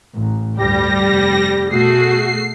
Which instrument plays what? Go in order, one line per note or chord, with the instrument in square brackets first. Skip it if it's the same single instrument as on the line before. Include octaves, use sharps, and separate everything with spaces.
[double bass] A1
[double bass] D2 G2 [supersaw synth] G3 A#6 [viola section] G4
[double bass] F1
[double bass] B2 [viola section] A3 F#4 G#4 [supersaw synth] C7